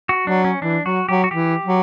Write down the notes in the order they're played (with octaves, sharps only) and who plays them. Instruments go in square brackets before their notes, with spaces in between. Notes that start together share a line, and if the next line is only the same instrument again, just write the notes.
[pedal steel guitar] F#4
[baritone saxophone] F#3 [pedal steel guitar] D4
[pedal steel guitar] C#4
[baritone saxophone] E3 [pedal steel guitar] D4
[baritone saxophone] F#3 [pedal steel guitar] F#4
[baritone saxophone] F#3 [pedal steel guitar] G4
[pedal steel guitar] F#4
[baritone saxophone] E3 [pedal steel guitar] G4
[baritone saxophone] F#3